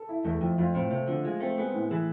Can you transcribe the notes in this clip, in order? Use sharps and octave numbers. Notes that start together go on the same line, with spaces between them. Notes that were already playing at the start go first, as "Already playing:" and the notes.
Already playing: A4
E4
E2 A3
F2 F3
F2 F4
A2 C4
C3 A3
D3 F3
G#3 F4
A3 C4
G#3 B3
A2
E3 G#4